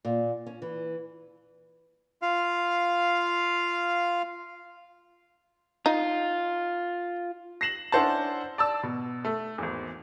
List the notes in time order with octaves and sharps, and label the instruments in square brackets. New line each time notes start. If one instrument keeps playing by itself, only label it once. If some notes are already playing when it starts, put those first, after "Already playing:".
[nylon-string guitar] A#2
C#4
E3
[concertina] F4 F5
[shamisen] D#4 [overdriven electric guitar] F4
[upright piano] A#6 C7 E7 F#7
C#4 D4 E4 C5 F#5 A5
D5 A5 E6
B2
A3
G#1 E2